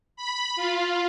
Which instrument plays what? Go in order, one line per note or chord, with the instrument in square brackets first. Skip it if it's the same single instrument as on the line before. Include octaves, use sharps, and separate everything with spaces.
[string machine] B5
F4